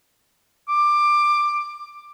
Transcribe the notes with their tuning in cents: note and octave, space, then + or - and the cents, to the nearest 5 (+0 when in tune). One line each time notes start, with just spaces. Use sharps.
D6 +15